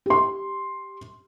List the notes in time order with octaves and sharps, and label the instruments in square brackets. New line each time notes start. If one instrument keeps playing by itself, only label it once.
[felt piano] G4 C6